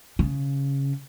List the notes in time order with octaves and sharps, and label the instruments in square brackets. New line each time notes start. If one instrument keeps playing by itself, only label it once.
[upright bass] C#3